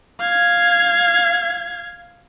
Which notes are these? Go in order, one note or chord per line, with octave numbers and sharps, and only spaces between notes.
F5 G#6